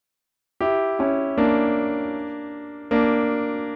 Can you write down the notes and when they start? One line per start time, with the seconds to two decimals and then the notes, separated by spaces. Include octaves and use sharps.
0.61 E4 G4
0.99 C#4 E4
1.38 A#3 D4
2.91 A#3 D4